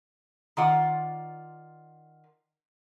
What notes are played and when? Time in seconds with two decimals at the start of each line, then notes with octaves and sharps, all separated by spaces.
0.57 D#3 F4 D5 F#5